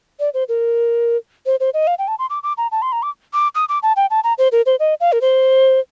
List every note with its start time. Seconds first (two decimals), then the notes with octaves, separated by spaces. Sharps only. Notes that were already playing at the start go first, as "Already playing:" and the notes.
0.20 D5
0.34 C5
0.49 A#4
1.46 C5
1.60 C5
1.74 D#5
1.87 F5
1.99 G5
2.08 A5
2.19 C6
2.30 D6
2.43 D6
2.58 A#5
2.72 A5
2.82 C6
2.92 A#5
3.03 D6
3.33 D6
3.55 D#6
3.69 D6
3.83 A5
3.96 G5
4.10 A5
4.24 A#5
4.38 C5
4.52 A#4
4.66 C5
4.80 D#5
5.00 F5
5.12 A#4
5.21 C5